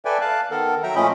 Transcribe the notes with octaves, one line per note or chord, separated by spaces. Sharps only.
A4 B4 D5 E5 G5 G#5
F5 A5 F#6
D#3 B3 A4 A#4
F#3 E5 G5 A#5
A#2 F3 A3 C#4 D#5 B5